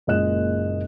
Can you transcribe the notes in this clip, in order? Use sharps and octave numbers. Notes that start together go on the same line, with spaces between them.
F#1 A#2 G#3 D#5 F#6 E7